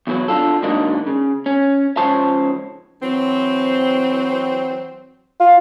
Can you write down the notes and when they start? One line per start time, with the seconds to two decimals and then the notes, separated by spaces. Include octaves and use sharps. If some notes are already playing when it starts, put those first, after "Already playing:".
0.07 E2 B2 F#3 B4
0.28 D4 F4 A4
0.63 G#2 D#3 F#3 A#3 D4 D#4
1.07 C#3
1.46 C#4
1.97 C#2 F3 C#4 C5 C#5 A5
3.02 E3 F#3 C4
5.40 F4